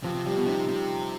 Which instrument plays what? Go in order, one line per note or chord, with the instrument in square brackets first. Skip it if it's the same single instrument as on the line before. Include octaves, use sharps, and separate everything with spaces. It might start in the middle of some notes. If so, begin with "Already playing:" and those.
[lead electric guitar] C3 [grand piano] F3
[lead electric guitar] C3
[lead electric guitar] C3 [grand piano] G3
[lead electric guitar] B2
[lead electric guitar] C3 [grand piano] D#4
[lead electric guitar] C3